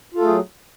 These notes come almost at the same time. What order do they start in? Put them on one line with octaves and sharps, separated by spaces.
F4 A4 A3 G#4 F#3